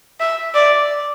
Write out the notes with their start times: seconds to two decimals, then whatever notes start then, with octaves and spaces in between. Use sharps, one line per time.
0.20 E5
0.55 D5